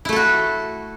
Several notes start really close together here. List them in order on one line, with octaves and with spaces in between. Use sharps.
E4 A3 A4 F#4